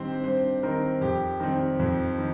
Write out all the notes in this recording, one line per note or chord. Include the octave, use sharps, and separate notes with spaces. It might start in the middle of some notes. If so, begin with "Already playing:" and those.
Already playing: G2 D#3 C4 G4 C5
G2 C5
D#3 C4 A#4
F2 G4
D#3 G3 C4
F2
D#3